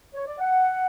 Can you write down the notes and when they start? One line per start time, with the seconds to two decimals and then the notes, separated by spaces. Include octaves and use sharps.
0.15 C#5
0.26 D5
0.39 F#5